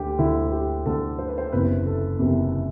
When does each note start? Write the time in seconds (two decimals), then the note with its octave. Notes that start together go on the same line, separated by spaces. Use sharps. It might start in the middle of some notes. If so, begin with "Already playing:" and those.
Already playing: D2 D3 G4
0.19 D2 D3 E4
0.52 G4
0.86 D2 D3 A4
1.19 C5
1.28 B4
1.38 C5
1.52 F#1 E2 C3 B4
1.86 A4
2.19 F#1 E2 C3